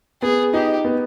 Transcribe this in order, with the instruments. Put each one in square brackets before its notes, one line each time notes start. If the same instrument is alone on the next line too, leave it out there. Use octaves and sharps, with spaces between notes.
[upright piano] B3 [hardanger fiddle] G#4
[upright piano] D#4 [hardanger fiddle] G4
[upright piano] B3